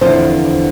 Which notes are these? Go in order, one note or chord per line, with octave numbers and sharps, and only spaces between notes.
E2 D3 F3 C4 C5